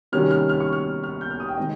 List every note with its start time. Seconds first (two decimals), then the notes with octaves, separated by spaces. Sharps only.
0.12 C3 D#3 G3 A#3 C#4 F6
0.31 F6
0.49 F6
0.60 C#6
0.73 F6
1.04 F6
1.21 G6
1.30 F6
1.40 D#6
1.48 G5
1.57 C3 D#3 G#3 C4 D#5